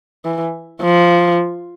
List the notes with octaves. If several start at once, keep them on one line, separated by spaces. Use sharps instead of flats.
E3
F3